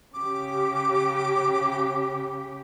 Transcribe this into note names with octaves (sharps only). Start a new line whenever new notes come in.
C#3 G4 D6